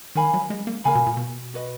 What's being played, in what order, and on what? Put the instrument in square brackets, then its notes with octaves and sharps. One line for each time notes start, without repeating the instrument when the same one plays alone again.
[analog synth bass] D#3 [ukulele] A#4 F5 G#5 B5
[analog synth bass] F#3
G#3
A#3
[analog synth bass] C#3 [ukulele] A#4 F5 G#5 B5
[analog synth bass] B2
A#2
B2
[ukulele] F#4 B4 D#5